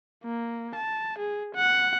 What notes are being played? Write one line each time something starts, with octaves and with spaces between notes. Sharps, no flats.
A#3
A5
G#4
F#5